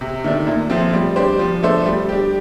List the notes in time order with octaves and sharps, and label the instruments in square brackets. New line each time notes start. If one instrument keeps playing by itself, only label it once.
[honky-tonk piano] C3
D#3 A3 D4
A#2
F3 A3 C4
G3
D4 G4 C5
F3
A3 D4 A4 C5
G3
D4 G4